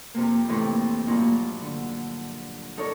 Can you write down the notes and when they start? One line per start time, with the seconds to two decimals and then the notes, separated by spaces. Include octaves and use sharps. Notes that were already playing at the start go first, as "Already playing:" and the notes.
0.14 F2 C3 A#3
0.48 F2 A2 C3 E3 F3 D#4
1.07 G2 A#2 F3 F#3 A#3 D#4
1.61 D3
2.77 D#4 A4 A#4 C#5 D5